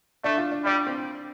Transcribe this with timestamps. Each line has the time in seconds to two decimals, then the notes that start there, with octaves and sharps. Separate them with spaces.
0.24 A3 D4
0.38 F4
0.52 D4
0.65 G3 D4
0.87 C4